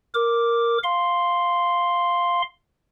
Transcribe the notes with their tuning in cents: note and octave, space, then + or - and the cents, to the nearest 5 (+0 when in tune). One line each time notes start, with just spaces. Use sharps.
A#4 +0 D6 +0
F5 +0 C6 +0